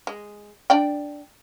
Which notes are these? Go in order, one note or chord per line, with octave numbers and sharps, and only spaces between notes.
G#3
D4 D5 G5